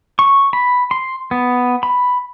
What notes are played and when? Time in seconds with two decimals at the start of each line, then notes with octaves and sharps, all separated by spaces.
0.19 C#6
0.53 B5
0.91 C6
1.31 B3
1.83 B5